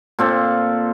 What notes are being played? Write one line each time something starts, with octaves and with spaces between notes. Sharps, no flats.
A#2 C4 A4